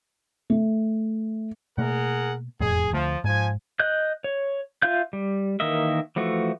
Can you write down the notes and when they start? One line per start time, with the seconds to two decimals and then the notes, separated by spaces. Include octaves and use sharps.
0.50 A3
1.78 B2 A3 A#3 G#4 A#4 F#5
2.60 E1 F2 A2 G#4
2.93 D2 F3 A3
3.24 G#2 F3 G#5
3.79 D#5 F#6 G6
4.24 C#5
4.82 F4 E5 F5 G6
5.13 G3
5.60 D#3 E3 A#3 D#5 E5
6.16 E3 F3 A3 F#4